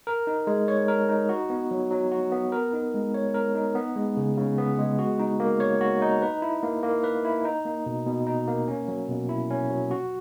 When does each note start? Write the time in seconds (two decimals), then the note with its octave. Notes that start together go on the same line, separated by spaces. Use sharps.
0.07 A#4
0.27 D#4
0.47 G#3
0.68 C#5
0.88 A#4
1.09 D#4
1.29 F#4
1.50 B3
1.71 F#3
1.91 F#3
2.12 F#4
2.32 B3
2.52 A#4
2.73 D#4
2.94 G#3
3.14 C#5
3.34 A#4
3.55 D#4
3.75 B3
3.96 G#3
4.17 C#3
4.37 C#3
4.58 B3
4.79 G#3
4.99 F#4
5.19 D#4
5.40 A#3
5.60 C#5
5.81 F#4
6.02 D#4
6.22 B4
6.42 E4
6.63 A#3
6.83 A#3
7.04 B4
7.25 E4
7.45 D#4
7.65 A#3
7.86 B2
8.07 B2
8.27 D#4
8.48 A#3
8.68 C#4
8.88 F#3
9.09 B2
9.29 E4
9.50 C#4
9.71 F#3
9.91 F#4